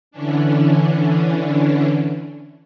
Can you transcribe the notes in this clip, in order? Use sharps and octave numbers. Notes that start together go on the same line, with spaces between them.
D3 E3 C#4 D4